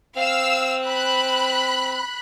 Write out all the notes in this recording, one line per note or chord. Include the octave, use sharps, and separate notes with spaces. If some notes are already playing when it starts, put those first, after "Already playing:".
C4 F5 E6
B5 F#6